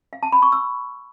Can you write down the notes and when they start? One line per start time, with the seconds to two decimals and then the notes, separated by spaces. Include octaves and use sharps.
0.13 F5
0.23 A5
0.32 B5
0.42 C#6
0.52 E6